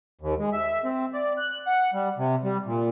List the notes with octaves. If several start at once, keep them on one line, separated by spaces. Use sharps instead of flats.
D#2
G#3
E5
C4
D5
F#6
F#5
G3
C3
G3
A#2